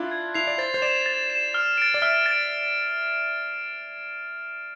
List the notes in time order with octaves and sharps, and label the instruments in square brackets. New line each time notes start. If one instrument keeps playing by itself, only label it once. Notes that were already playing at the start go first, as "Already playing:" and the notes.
Already playing: [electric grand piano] D4 E4 F4
[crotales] G#6
[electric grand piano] E4 [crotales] C7 F7
[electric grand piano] D5
[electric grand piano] C5 [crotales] A6
[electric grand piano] C5
[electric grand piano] D5 [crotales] E7
[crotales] A6
E7
F6
A6 D7
[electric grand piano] D5
[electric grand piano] E5 [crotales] F6
[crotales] A6 D7